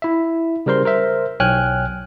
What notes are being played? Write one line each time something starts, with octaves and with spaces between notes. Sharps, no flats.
E4 E5
C#3 G3 A#4 C5 C6
A#4 C5 E5
B1 C#5 G5 G#5 F6 F#6